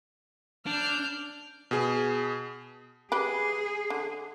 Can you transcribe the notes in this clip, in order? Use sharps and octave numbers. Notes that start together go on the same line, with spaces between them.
D4 F6 G6
B2 G#4
G4 G#4 B4
D3